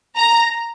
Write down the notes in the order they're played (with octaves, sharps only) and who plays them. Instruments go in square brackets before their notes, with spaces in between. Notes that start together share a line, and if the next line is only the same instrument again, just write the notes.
[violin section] A#5